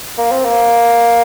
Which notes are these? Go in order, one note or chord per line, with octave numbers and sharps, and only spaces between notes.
A#3
C4
A#3